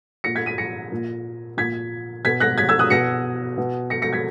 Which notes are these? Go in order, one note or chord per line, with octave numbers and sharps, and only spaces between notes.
A#2 A#6 C#7
G#6 B6
B6 D#7
A#6 C#7
A#2
A#2 G#6 B6
B2 G#6 B6
F#6 A#6
G#6 B6
E6 G#6
D#6 F#6
B2 A#6 C#7
B2
A#6 C#7
A#6 C#7
G#6 B6